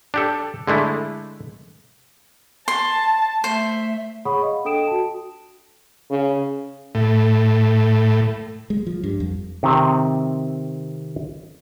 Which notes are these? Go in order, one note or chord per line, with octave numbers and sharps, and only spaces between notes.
D4 G4 A4
D3 G#3 A3 E4
A5 C6
A3 C5 E5
G#4 C#5 F#5 B5 C#6 D#6
D#5 F5
D4 A4 G5 D#6 D7 E7
F#4 A5
C#3
A2
G#3
F3
G2
F2
C3 D#3 C4